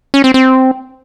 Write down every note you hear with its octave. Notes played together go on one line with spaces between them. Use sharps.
C#4
C4
C4